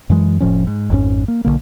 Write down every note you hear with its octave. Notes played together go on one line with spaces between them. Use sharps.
F#2 E3 G#3
F1 A2 F3 C#4
G#2
G#1 F2 G#2 C#4
A#3
B1 F2 D3 A#3